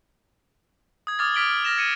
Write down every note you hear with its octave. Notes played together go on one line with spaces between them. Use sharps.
D#6 G#6
D6 D#6 F6 G#6 A6
D6 F6 B6 D7 F#7 G7
F6
F6 A6 A#6 E7
G#6 C#7 D#7